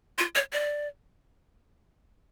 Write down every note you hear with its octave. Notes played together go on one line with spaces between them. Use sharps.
F4
C#5
D5